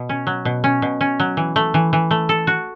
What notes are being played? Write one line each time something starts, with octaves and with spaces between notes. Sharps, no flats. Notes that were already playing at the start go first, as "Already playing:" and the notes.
Already playing: B2
C#4
F#3
B2
C#4
B2
C#4
F#3
E3
A3
E3
E3
A3
A4
F#4